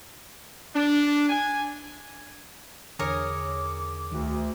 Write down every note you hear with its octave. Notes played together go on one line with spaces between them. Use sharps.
D4
G#5
E2 D3 G#4 A#4 C#5 D6
D2 D#3 F#4